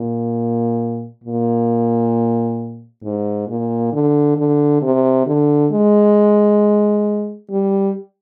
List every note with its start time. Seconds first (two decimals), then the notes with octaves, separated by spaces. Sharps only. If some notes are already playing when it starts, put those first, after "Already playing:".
Already playing: A#2
1.24 A#2
3.03 G#2
3.48 A#2
3.93 D3
4.37 D3
4.81 C3
5.26 D3
5.72 G#3
7.51 G3